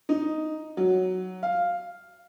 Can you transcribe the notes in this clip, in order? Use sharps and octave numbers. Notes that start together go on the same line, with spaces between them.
D#4
F#3
F5